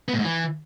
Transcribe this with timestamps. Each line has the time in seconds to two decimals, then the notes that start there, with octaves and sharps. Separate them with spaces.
0.08 B3
0.14 A2
0.19 G#2
0.24 E3